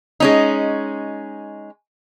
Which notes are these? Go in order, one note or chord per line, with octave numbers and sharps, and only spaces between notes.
G#3 C#4 D#4